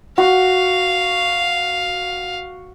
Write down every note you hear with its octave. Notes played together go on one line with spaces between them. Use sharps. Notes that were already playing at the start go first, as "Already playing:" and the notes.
F#4 F5